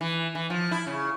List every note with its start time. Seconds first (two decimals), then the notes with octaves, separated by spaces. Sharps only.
0.01 E3
0.35 E3
0.50 F3
0.71 E4
0.87 C#3